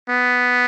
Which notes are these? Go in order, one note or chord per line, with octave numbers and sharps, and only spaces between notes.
B3